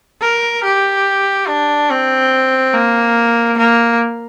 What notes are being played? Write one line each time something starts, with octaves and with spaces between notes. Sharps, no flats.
A#4
G4
D4
C4
A#3
A#3